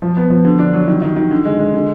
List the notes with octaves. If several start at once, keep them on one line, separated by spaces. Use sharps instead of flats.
F3
B3
F3
D3
D4
F#3
D#3
D#3
D#3
D3
G#3
G#3
D3